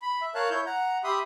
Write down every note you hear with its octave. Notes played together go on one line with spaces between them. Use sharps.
B5
E5
A#4 C#5 F5 A5 F#6
E4 C#5 G6
F#5 A#5
G4 E5 B5 C6 D#6